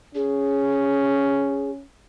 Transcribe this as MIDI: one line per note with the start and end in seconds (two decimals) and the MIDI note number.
0.15 1.84 61
0.15 1.71 68